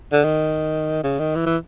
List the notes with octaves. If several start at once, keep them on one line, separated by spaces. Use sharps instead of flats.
D3
D#3
C#3
D#3
E3
E3